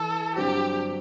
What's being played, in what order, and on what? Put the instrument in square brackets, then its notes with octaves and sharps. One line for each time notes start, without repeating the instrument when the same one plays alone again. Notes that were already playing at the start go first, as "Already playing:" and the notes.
Already playing: [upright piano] E3 [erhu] A4
[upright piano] G2 D3 F#3 C4 F#4 [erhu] G4